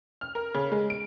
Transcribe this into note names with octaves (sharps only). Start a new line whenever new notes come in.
F6
A#4
C#3
G#3
D7